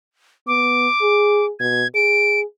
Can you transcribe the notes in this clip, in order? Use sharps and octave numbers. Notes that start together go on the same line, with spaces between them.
B3 D6
G#4
B2 G#6
G#4 D7